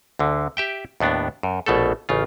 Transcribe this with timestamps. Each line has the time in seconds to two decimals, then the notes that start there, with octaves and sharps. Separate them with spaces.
0.19 D2 D3
0.57 G4 E5 G5
1.00 D#2 A2 B3 D4
1.43 F#2
1.66 A#1 B2 A3 A4
2.09 A1 C#3 F4